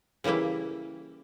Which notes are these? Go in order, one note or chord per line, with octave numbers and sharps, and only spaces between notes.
C#3 E3 G3 A#3 E4